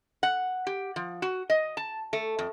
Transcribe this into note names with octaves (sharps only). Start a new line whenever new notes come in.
F#5
G4
F3
F#4
D#5
A5
A3
F2